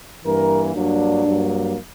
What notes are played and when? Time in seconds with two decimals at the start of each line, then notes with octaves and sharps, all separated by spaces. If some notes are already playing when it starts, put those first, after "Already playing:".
0.25 G2 E3 A#3 A#4
0.75 G2 F#3 A#3 D4
1.25 G2 F#3 A#3